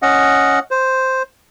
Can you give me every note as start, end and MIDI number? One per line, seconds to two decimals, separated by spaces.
0.02 0.59 61
0.02 0.59 75
0.02 0.59 78
0.71 1.22 72